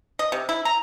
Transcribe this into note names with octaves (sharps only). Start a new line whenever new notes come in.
D#5
C3
E4
A#5